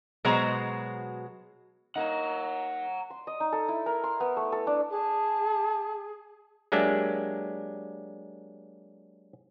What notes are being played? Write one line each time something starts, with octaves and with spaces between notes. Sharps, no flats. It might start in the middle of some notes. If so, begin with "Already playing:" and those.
B2 F#3 G#3 F#4 C5 A#5
A#3 D#4 F#5 A#5
C6
D#5
D#4
A4
E4
A#4
C6
B3
A3
A4
D4
G#4 A5
F#3 G#3 A#3 D4 G4 E5